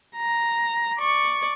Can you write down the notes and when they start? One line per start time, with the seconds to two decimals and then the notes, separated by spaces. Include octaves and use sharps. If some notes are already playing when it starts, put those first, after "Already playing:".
0.16 A#5
0.98 D5 C#6